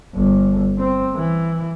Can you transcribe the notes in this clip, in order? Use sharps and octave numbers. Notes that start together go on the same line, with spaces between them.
G1
C4
E3